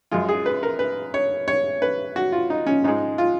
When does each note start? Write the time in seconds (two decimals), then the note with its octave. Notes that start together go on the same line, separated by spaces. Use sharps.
0.11 F#2 F3 G#3 F4
0.29 G#4
0.46 B4
0.63 A#4
0.79 B4
1.14 C#5
1.48 C#5
1.82 B4
2.16 F#4
2.32 F4
2.50 D#4
2.67 C#4
2.84 G#2 F3 G#3 D#4
3.18 F4